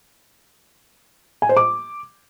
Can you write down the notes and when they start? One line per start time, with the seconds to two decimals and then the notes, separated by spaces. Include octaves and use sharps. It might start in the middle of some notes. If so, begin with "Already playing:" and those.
1.42 G#5
1.49 C5
1.57 D6